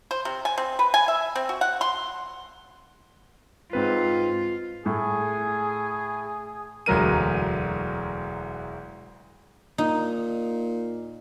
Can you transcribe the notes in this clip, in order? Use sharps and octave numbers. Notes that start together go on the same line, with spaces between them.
C5
C3
G#5
C4
B4
G#5
E5
C4
F#4
F#5
C6
G#2 C4 F4 B4
A2 G#4
E1 D2 F#3 A#4 D#7
A#2 D#4